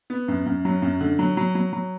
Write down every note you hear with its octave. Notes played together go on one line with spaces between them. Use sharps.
B3
F#2
F#2
F#3
F#2
D3
F#3
F#3
F#3
F#3